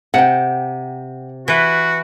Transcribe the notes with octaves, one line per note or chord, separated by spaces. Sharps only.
C3 F#5 G5
E3 F#4 B4